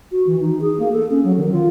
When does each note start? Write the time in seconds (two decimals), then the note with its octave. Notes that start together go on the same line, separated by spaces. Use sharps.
0.12 F#4
0.27 E3
0.40 D#4
0.61 G#4
0.79 A#3
0.92 A4
1.11 C#4
1.24 F#3
1.37 D#3
1.52 F4